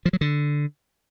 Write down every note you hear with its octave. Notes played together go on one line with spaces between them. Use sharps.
F3
F#3
D3